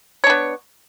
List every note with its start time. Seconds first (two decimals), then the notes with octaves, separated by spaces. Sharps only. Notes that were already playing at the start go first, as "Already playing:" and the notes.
0.24 C#5
0.27 D4
0.30 B3